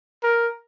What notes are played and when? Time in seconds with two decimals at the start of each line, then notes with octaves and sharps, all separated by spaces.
0.23 A#4